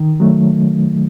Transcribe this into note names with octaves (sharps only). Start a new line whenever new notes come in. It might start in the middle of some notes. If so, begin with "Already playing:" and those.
Already playing: D#3
F#3 A3